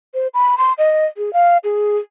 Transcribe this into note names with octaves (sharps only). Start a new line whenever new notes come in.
C5
B5
C6
D#5
G#4
F5
G#4